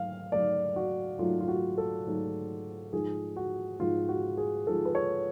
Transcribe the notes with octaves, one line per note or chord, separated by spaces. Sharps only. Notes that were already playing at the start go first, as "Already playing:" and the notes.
Already playing: G#2 F#3 A3 F5
G#2 F#3 A3 D5
F#4
G#2 F#3 A3 F4
F4
F#4
A4
G#2 F#3 A3
G#2 F3 G#3 G#4
F#4
G#2 F3 G#3 F4
F#4
G#4
G#2 F3 G#3 A4
B4
C#5